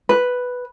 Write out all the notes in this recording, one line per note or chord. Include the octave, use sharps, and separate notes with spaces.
B4